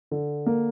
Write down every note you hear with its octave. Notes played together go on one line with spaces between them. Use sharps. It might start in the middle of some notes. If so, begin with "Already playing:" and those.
D3
A#3